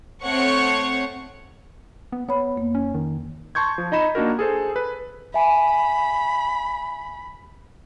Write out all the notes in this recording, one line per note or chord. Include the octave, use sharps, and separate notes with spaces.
A3 C4 C#5 F#5 C#6
B3
B3 C#5 B5
F2 A#3
C#4
D#3
A5 C6 C#6 G6 G#6
F3
D#4 D#5 B5 E7
A#3 D4 D#4 F#4 A#4
G#4 A4 C5
B4
E5 G#5 B5